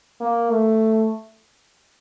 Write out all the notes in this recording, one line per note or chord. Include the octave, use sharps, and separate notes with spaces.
A#3
A3